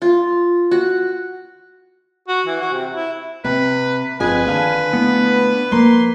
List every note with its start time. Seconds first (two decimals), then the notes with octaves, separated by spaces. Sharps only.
0.02 F4
0.71 F#4
2.28 F#4
2.46 E3
2.61 F#4
2.73 C3
2.93 E4
3.44 C3 C4 B4
4.20 G1 F2 G#4 B4 G#5
4.47 D3 D#3 F5 A5
4.93 A3 B3 E4
5.72 F3 A#3 C6